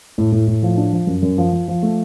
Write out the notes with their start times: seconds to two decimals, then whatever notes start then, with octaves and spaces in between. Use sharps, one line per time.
0.18 A2
0.32 A2
0.48 A2
0.63 F3
0.77 D4
0.93 F3
1.07 F#2
1.22 F#2
1.38 F3
1.53 F3
1.68 F3
1.83 A3